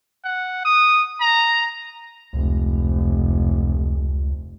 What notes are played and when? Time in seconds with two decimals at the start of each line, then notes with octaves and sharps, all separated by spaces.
0.25 F#5
0.65 D#6
1.21 A#5
2.33 F1 C#2